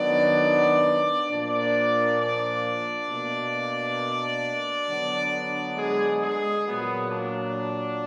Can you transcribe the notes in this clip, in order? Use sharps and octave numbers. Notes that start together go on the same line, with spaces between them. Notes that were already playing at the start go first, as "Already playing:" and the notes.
Already playing: D#3 F#3 B3 D4 D5
A#2 F3 A#3 D4 D5
D4 D5
B2 A#3
D3 F#3 B3
G#3 G#4
G#3 G#4
A#2 F#3 A#3 B3
D4